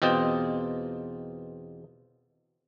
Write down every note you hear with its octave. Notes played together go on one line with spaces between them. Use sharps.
E2 B2 C4 F4 D#5 G5